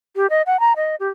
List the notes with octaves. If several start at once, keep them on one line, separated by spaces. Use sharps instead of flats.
G4
D#5
F#5
A#5
D#5
G4